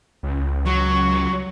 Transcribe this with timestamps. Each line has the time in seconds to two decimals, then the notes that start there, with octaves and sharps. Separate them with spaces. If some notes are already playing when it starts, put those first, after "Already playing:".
0.23 C#2
0.66 F#3 C#6